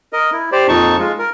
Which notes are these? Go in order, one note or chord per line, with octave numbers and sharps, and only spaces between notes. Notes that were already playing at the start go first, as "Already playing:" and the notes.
A#4 D#5
E4
G4 C5 D5
F2 A#2 D#4 A5 C#6
G#3 F4
A#4